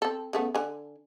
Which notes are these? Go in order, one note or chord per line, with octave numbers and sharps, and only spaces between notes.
C4 A4
C#3 A3 B3
D3 G#5